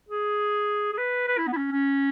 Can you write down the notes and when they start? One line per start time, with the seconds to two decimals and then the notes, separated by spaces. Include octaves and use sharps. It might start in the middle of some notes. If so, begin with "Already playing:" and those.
0.09 G#4
0.93 G#4
0.98 B4
1.28 B4
1.38 E4
1.47 B3
1.53 E4
1.57 C#4
1.71 C#4